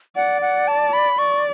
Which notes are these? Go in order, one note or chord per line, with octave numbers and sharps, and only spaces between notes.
D5 F#5
F#5
A5
B5
D5 C#6